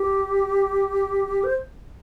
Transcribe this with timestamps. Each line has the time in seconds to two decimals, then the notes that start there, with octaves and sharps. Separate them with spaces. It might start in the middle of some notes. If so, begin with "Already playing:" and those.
Already playing: G4
1.44 C5